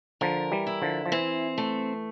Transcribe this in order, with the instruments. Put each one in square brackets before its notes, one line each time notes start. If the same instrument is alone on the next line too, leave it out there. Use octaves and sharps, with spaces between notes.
[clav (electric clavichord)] D3 F3 [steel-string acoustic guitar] A#4
[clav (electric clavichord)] E3 G3
[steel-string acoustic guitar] E4
[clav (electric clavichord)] D3 F3
F3
[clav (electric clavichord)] E3 [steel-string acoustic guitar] C4
[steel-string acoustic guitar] A3